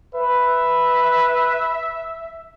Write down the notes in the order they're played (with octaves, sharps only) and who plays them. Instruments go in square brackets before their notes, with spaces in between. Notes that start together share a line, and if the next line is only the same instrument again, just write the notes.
[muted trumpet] B4 [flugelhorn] E5